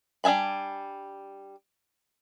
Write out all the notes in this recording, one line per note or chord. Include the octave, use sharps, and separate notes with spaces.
G3 D4 E5 G#5 B5